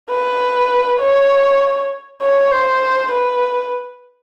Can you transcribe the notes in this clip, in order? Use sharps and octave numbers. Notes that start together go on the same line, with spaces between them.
B4
C#5
C#5
C5
B4